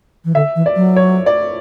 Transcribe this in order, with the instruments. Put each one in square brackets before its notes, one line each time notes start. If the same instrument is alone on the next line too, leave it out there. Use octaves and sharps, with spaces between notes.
[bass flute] E3
[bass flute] D3 [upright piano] E5
[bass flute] E3
[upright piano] D5
[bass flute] F#3
[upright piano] C#5
D5